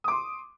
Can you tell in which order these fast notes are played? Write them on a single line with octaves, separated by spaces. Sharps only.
D#6 D6 C6